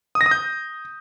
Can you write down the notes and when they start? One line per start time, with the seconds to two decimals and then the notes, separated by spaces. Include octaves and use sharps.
0.15 D#6
0.21 A#6
0.26 D#6
0.31 G6